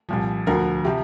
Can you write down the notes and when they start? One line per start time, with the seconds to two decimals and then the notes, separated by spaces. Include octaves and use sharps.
0.09 C2 A#2 F3
0.47 D2 D3 F3 A#4
0.85 C3 F3 G4